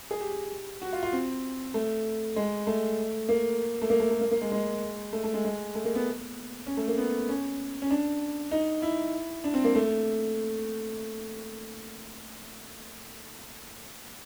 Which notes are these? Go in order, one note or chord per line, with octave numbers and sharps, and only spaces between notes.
G#4
G4
F#4
F4
F4
C4
A3
G#3
A3
A#3
A3
A#3
A3
A3
A#3
A#3
G#3
G#3
A3
A3
G#3
G#3
A3
A#3
B3
C#4
A3
A#3
B3
C#4
C#4
D4
D#4
E4
D4
C4
A#3
A3